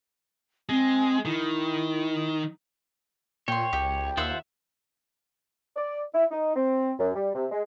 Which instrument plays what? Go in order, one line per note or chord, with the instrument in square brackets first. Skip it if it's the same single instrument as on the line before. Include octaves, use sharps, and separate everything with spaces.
[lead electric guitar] G#3 [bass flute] C4
[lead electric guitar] D#3 [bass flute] E4
[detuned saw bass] A#2 [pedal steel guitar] C#5 [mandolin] G5 C6
[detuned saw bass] C#2 [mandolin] G4
[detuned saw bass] D#2 [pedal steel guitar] F4 C5 F#5 [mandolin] E5 E6
[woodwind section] D5
E4
D#4
C4
F#2
G3
C3
G#3